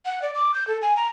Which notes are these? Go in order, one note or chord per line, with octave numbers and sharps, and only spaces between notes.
F#5
D5
D6
G6
A4
G#5
A#5